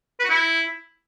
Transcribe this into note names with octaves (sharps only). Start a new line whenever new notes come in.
B4
F#4
E4